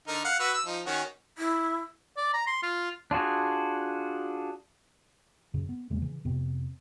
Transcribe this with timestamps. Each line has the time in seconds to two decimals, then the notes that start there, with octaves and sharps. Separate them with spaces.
0.08 D3 D#4 A#4
0.25 F5 F#5
0.40 F#4 B4 E6
0.54 E6
0.66 F3 D#4
0.86 D#3 C#4 F#4
1.38 E4
2.17 D5
2.33 A#5
2.47 C6
2.63 F4
3.11 D4 F4 F#4 G#4
5.54 F#2 C#3
5.69 B3
5.90 E2 C#3 G#3 A#3
6.02 C#3 E3
6.25 F2 C3 B3 C4